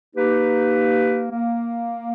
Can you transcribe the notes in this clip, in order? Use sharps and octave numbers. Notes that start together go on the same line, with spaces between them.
A#3 D#4 G4 B4
A#3